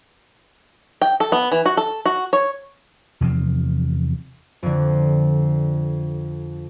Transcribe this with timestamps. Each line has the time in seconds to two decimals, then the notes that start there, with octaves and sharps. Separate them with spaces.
1.02 G5
1.20 A4
1.32 B3
1.52 E3
1.66 F#4
1.77 A4
2.06 F#4
2.33 C#5
3.21 E2 C3 F3 C4
4.63 F2 D3